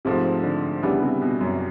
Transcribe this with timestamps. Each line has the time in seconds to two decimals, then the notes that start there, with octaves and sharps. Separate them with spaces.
0.05 G#2 C3 F3 A3
0.43 D3
0.82 C#3 E3 G3 B3 D4
1.02 C3
1.22 B2
1.41 F#2